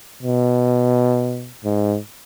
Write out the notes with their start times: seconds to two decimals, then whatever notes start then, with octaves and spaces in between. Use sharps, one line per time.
0.23 B2
1.65 G#2